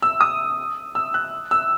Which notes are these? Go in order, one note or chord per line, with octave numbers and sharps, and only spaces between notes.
E6
D#6
E6
F#6
E6